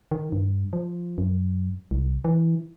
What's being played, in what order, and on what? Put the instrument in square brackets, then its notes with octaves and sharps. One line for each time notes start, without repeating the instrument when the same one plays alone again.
[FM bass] D#3
G2
F3
F#2
C2
E3